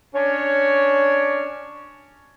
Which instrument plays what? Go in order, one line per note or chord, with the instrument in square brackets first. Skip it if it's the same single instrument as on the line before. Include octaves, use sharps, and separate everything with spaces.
[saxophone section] C#4 D4 C#5